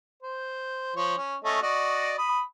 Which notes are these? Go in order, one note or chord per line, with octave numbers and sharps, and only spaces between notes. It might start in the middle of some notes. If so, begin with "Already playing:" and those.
C5
F3 C#5
C#4
A3 C#4 D#5
F#4 D5 D#5
B5 D#6